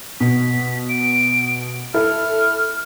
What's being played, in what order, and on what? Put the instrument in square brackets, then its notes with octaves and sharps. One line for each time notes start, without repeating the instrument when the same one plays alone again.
[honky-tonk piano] B2 [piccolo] B6
[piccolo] D7
[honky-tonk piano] E4 A4 [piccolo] F6